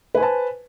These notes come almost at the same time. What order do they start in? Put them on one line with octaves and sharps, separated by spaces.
B4 G#5 C5 A5